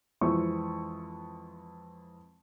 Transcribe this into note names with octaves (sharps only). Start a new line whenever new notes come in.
F2 E3 G#3 E4 C5 C#6